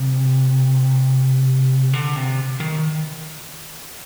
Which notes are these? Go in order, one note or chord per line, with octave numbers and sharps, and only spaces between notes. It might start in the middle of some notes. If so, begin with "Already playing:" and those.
Already playing: C3
D3
C3
D#3